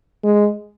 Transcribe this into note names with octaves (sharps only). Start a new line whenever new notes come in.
G#3